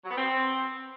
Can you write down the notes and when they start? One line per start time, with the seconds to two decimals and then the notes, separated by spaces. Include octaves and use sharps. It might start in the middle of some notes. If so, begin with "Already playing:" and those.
0.05 F#3
0.11 B3
0.17 C4